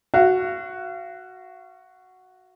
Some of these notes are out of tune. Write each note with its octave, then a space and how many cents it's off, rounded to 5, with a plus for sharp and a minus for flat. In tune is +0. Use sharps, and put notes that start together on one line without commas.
F#4 +0 F5 -35